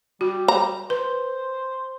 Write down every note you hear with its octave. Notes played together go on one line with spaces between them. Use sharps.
G3 F#4
A#5
B4 C5